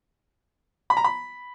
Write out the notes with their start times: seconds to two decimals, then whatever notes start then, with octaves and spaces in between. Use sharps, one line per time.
0.90 B5
0.97 A#5
1.04 B5